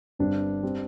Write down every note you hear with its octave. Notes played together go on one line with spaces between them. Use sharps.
G1 G2 G3 C4 D4
G3 C4